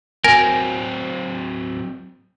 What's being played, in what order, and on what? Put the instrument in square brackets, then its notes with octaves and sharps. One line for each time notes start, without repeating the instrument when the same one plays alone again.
[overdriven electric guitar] F#3 C4 [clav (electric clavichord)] A#4 [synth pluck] G#5